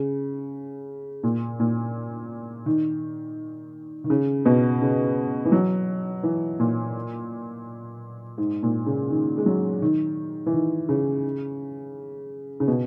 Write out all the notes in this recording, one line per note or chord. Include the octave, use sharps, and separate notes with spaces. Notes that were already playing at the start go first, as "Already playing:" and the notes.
Already playing: C#3
A#2
A#2
D#3
D#3
C#3
B2
C#3
E3
F#3
E3
A#2
G#2
A#2
C#3
D#3
G#3
F#3
D#3
E3
D#3
C#3
C#3
B2